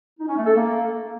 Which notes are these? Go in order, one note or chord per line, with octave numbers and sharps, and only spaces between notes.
D#4
C#4
A3
A4
A#3